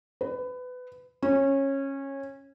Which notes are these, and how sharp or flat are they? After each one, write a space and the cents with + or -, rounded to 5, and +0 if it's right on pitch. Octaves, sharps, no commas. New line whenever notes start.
B4 +25
C#4 -20